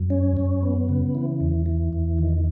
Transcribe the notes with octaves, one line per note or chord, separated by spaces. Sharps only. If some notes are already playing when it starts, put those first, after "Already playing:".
Already playing: F#2
C#4
F#2
B3
C#3
E3
E2
E3
E2
D#3